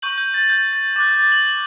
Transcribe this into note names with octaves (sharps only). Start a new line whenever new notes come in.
C#6 G6 F#7
G6
A6
G6
A6
D6 F#6 A6
G6
A6
F#7
F#7